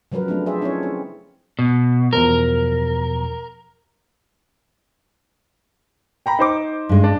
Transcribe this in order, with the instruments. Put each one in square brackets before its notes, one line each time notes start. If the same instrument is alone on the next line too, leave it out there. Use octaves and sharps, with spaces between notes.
[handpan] C#3 F3 F#3 A#4 B4
F#3 A3 C4 D4
F4 G#4 A4 C5 D5 E5
C4 C#4 D#4 E4 A4 C#5
C4
[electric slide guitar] B2
[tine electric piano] E2 B2 F3 [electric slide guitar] A#4
[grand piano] G5 A#5 B5
D#4 C5 D6
[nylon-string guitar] G2 G#3
[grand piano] D4